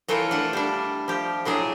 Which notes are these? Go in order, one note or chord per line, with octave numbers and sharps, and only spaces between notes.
E3 A3 F4 A4 A#4 C#5
D4 F#5
G3 D4
F3 G4
A2 F#3 D4 G#4